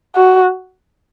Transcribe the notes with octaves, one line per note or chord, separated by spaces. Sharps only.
F#4